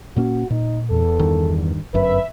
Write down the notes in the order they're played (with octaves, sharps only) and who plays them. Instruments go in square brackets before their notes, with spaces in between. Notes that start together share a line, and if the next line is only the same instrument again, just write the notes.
[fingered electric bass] A#2 A#3 C#4 [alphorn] F#4
[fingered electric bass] A#2 [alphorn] D#4
[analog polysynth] E2 [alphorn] A4
[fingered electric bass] G2 D#3
[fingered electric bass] G1 F#2 [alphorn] B4 [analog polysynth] E5